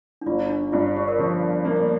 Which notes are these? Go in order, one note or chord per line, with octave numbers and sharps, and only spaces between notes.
D4
G1 F4
D4
G2 F4
G4
A#4
F3 G4
A#3